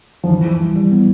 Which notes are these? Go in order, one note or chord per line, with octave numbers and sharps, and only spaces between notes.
F3
E3 E4
E4
G3
G3
B3